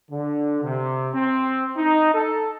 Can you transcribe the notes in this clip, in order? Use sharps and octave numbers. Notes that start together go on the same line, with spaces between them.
D3
C3
C4
D#4
A4